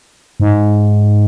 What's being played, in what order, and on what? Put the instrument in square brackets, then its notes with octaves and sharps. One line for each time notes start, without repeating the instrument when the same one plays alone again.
[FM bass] G#2